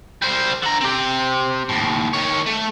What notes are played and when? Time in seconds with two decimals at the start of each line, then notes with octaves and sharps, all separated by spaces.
0.22 G3 C5
0.63 D3 A#5
0.81 C4 G4
1.69 D#2 A2
2.13 D#3 C#5
2.46 A3